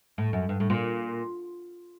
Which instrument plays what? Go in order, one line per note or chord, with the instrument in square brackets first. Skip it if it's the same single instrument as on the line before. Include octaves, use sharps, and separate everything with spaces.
[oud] A2
F#2
G2
A2
A#2